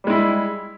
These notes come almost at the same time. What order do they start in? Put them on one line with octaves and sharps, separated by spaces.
G3 G#3 E4